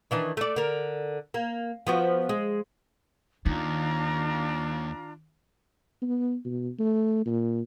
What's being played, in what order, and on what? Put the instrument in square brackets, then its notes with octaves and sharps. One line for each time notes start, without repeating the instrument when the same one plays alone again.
[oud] D#3 E3 D4
A3 D5
D3 A#4
A#3
F3 B3 F#4
G#3
[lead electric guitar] D#2 [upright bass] D#3 [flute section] D4 F4 A#5
[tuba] B3
B2
A3
A#2